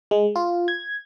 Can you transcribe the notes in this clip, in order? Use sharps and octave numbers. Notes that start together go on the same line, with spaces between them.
G#3
F4
G#6